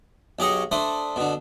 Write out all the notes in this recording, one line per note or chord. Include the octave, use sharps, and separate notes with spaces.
B1 G4 G#4 D#5 C#6
A3 D4 C5 D#6
B2 D3